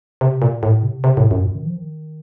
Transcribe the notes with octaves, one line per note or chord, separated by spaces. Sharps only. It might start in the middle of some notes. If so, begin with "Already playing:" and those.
C3
A#2
A2
C3
C3
A2
F#2
A#2
D#3
F3
D#3